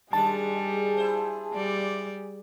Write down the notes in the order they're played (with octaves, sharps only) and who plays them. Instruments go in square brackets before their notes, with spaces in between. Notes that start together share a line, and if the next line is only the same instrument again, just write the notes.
[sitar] D#3 G#3 D4 [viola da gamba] G3 [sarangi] G#4 [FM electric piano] A5
[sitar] E4 C5
[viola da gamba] G3 D5